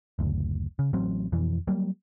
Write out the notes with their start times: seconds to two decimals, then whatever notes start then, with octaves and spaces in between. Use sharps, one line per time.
0.19 F#1 D2
0.79 C#3
0.93 A1 F#3 C4
1.32 F2 B2 E3
1.67 F#3 G3 A#3